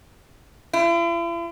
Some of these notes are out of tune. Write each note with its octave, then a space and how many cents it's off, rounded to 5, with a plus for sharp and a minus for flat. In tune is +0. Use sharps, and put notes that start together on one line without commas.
E4 +45